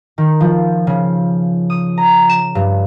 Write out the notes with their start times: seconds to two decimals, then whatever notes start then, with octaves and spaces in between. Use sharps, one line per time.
0.18 D#3
0.41 F3
0.87 C#3
1.70 D#6
1.98 A#5
2.29 E7
2.55 G2